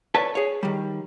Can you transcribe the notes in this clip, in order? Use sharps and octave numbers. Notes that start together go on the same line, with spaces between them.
A4 B4 C#5 D5 A5
G#4 C#5
D#3 G3